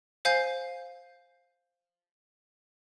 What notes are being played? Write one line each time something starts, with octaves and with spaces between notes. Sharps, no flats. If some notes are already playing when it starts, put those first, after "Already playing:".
C5 F5 G#5 G6 C7